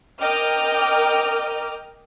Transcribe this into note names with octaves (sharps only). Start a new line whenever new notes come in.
A#4 D#5 G5 D6 F6